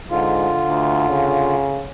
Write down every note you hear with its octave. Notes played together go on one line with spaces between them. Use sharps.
G#2 D3 F4
D2
C#3